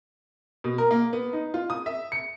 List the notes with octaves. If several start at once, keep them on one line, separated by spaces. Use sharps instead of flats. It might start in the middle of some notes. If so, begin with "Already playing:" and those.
B2
A#4
A#3
B3
D#4
F4
D#6
E5
C#7